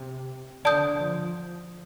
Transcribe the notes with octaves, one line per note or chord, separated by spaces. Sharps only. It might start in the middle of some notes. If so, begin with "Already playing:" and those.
Already playing: C3
D3 D5 A5 D#6 G6
F3